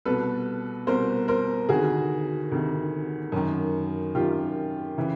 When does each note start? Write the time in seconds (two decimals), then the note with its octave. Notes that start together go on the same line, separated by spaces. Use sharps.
0.05 C2 B2 A4 B4
0.87 C2 B2 A#4 C5
1.28 A#4 C5
1.69 D2 C3 D#3 F#4 G#4
2.51 D2 C3 D#3
3.32 F#2 D#3
4.15 F#2 D#3 F4 G4
4.98 C#3 E3